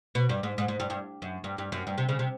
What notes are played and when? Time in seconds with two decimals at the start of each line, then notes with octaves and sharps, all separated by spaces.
0.15 B2
0.29 G2
0.43 G#2
0.58 G#2
0.68 G#2
0.80 G2
0.90 G2
1.22 F#2
1.44 G2
1.58 G2
1.72 F#2
1.87 G2
1.98 C3
2.09 C#3
2.19 C3